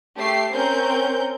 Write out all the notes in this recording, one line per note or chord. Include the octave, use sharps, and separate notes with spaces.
A3 G4 C7
C4 C#4 A#4 G6